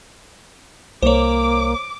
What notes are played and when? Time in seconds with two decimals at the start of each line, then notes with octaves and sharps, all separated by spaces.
1.02 C2 A#3 C5 C#5 D6